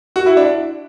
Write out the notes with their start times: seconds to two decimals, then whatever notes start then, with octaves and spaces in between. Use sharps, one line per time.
0.16 F#4
0.26 E4
0.37 D4